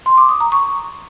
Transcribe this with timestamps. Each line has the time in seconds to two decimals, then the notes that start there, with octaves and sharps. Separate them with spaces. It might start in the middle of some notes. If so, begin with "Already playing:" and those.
0.06 C6
0.17 D6
0.29 D#6
0.40 A#5
0.52 C#6